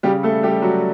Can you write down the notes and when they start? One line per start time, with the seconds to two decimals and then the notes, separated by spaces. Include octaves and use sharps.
0.03 C#3 G3 G4
0.23 A3 A4
0.43 G3 G4
0.62 F#3 F#4